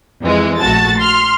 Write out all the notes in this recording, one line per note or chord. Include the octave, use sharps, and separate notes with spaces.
F2 E3 G#3
A#1 A3 F#4 A5 A6
C6 F6